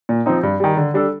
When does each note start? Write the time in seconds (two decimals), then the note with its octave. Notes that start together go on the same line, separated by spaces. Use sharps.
0.09 A#2
0.26 F3 C4 D#4
0.43 G2
0.60 D#3 G3
0.77 D3
0.94 G3 D4 A4